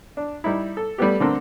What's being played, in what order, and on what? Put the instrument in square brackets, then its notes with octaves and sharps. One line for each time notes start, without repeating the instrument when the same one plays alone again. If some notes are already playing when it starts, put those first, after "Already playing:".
[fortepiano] D4
G3 D#4 E4
A4
G3 A3 B3 G4
D3 A3 C4 A4 A#4